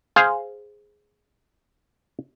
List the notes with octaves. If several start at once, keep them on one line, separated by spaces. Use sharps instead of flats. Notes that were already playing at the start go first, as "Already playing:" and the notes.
G#4 C5 F5